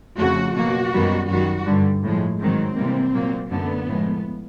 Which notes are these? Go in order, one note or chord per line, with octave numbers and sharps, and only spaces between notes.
F2 C#3 F3 A3 F#4
B2 F#3 A#3 F#4
F#2 D#3 G3 B3
F#2 D#3 G3 F#4
G2 D3 G3
A2 F3 G#3
G#2 D#3 F#3 C4
C3 E3 G3 A#3
A#2 F#3 A#3
F#2 D3 F#3 A3 B3
A2 F3 G#3